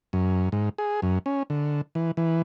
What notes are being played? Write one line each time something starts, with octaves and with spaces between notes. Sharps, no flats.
F#2
G#2
G#4
F#2
C#4
D3
E3
E3